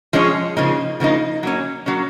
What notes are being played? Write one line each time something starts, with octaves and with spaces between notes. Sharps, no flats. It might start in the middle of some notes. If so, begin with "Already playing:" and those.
F3 G#3 C#4 G#4 C#5
C#3 F3 A#3 D#4
C#3 F3 A#3 D#4
F#3 A#3 C#4
F#3 A#3 C#4